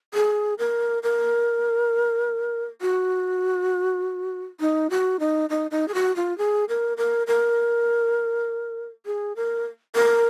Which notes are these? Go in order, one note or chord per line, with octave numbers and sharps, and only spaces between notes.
G#4
A#4
A#4
F#4
D#4
F#4
D#4
D#4
D#4
G#4
F#4
F4
G#4
A#4
A#4
A#4
G#4
A#4
A#4